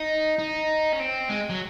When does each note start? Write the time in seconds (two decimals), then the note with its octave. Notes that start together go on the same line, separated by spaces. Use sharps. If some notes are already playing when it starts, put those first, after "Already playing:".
Already playing: D#4
0.39 D#4
0.93 C#4
1.00 C4
1.29 G#3
1.50 F#3